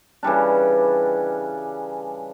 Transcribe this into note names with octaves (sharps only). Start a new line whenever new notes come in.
C#3 E3 G3 D4